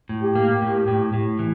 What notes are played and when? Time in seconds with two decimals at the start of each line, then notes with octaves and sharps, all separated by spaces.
0.09 A2
0.23 G4
0.35 A#3
0.62 A2
0.88 A2
1.14 A2
1.39 E3